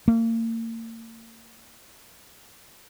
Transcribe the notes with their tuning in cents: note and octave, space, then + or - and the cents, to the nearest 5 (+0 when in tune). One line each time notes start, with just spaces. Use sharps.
A#3 -40